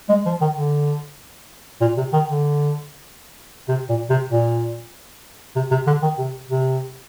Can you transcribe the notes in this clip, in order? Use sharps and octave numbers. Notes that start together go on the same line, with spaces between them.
G#3
F3
D#3
D3
A#2
C3
D#3
D3
C3
A#2
C3
A#2
C3
C3
D3
D#3
C3
C3